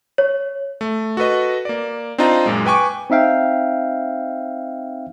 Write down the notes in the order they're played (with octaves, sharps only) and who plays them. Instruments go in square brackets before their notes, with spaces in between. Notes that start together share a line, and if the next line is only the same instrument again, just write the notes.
[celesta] C#5
[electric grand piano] A3
F#4 A4 B4 D#5
A#3 D5
C4 D4 D#4 F4 D#5 A#5
F#2 A#2 G#3
B4 G5 G#5 C#6 D6
[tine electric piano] C4 D#4 E5 F5 G5